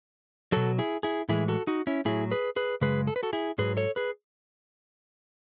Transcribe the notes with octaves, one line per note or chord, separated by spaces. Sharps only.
B2 F#3 F#4 A4
E4 G#4
E4 G#4
A2 E3 G#3 E4 G#4
F#4 A4
D#4 F#4
C#4 E4
A2 F#3 E4 G#4
G#4 B4
G#4 B4
F#2 C#3 G#3 G#4 B4
A4
B4
F#4 A4
E4 G#4
G#2 F#3 G#4 B4
A4 C#5
G#4 B4